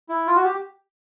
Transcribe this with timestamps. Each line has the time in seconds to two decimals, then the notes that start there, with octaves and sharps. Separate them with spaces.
0.09 E4
0.27 F4
0.36 F#4
0.45 G4